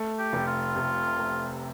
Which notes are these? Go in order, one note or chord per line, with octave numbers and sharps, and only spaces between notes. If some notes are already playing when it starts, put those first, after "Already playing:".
Already playing: A3
G4
F1
F4
C3
A3